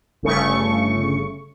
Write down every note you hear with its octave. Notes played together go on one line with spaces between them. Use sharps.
G1 C#3 A3 C#6